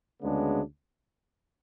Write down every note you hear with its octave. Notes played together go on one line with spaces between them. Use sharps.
D2 C#3 G#3 B3 D4